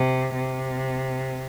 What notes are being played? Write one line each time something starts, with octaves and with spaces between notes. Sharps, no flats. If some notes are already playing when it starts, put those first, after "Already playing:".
Already playing: C3
C3